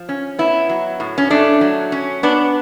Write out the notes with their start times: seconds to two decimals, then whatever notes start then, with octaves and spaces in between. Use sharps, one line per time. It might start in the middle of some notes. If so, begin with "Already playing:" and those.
Already playing: F3
0.09 C#4
0.39 B3 E4
0.69 F#3
1.00 A2
1.18 C#4
1.30 A3 D4
1.61 F#3
1.92 C#4
2.23 B3 D4